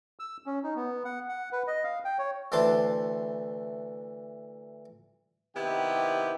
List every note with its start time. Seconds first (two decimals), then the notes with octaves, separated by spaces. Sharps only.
0.19 E6
0.46 C#4
0.63 D#4
0.76 B3
1.05 F#5
1.29 F#5
1.52 B4
1.67 D#5
1.84 F5
2.05 G5
2.19 C#5
2.52 D2 E3 D4 C5 A5
5.55 C3 D#3 B3 E4 G4